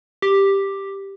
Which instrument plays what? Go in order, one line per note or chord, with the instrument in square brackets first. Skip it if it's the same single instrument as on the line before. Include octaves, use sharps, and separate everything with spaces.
[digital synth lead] G4